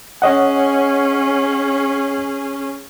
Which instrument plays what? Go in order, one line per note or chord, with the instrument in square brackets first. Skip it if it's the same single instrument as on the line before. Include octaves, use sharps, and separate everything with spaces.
[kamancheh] C#4 G#4 [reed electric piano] C#5 D#5 F#5